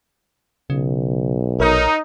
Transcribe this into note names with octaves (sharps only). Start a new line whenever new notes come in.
B1 C#3
A#1 D#4 A#4 C#5 F6